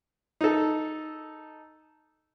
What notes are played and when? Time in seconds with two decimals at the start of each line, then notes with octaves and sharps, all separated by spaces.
0.41 D#4 A4